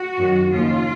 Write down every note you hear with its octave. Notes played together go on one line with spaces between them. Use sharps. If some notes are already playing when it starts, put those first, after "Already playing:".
Already playing: F#4
F#2 D#3 F#3
D#2 C#3 F3 F4